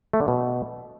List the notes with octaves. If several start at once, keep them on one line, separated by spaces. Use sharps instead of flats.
A3
D3
B2